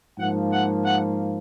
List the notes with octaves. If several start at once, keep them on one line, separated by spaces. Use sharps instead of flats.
G#2 F3 A#3 F#5
F#5
F#5